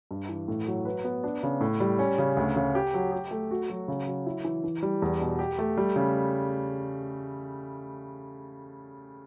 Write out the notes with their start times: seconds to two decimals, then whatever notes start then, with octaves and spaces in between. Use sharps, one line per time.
0.11 G2
0.29 E3
0.48 A2
0.67 F#3
0.85 B4
1.04 B3
1.24 D4
1.43 C#3
1.61 A2
1.80 G3
1.99 C#4
2.18 C#3
2.37 D2
2.56 C#3
2.75 G4
2.94 F#3
3.12 G4
3.31 A3
3.51 F#4
3.70 F#3
3.88 C#3
4.07 F#3
4.27 E4
4.44 E3
4.64 E3
4.83 G3
5.02 E2
5.21 B2
5.39 G4
5.59 A3
5.77 G3
5.96 C#3